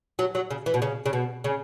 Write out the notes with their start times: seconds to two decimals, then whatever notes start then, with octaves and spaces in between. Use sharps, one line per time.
0.19 F#3
0.35 F#3
0.50 C#3
0.66 E3
0.74 B2
0.82 C#3
1.06 C#3
1.13 B2
1.44 C#3